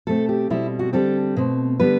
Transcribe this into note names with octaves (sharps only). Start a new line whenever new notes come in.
B2 A3 C4 A4
G4
B2 G3 C4 E4
F#4
D3 G3 C4 A4
B2 A3 C4
D3 G3 B3 B4